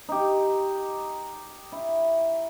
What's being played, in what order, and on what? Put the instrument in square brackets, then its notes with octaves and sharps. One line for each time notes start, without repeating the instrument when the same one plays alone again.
[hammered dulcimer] D#4 G4
E4